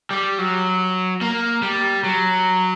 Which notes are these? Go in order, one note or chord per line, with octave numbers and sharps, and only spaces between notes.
G3
F#3
A#3
G3
F#3